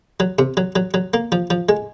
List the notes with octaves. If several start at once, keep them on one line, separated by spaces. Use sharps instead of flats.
F#3
C3
F#3
F#3
F#3
A#3
F3
F3
G#3